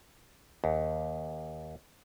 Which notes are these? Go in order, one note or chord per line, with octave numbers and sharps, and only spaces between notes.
D#2